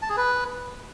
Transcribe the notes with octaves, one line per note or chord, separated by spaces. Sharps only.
A5
G#4
B4